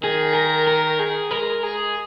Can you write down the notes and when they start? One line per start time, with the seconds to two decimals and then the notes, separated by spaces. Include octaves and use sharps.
0.02 D#3 G#4
0.34 A#4
0.67 A#4
0.99 G#4
1.30 G#3 A#4
1.63 G#4